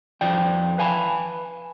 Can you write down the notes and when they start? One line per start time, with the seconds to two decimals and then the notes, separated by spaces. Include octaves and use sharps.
0.21 F2 F3 D5 G5
0.78 B4 F5 G#5 A5 B5